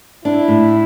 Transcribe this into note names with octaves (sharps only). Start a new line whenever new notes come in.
D4 E4
A2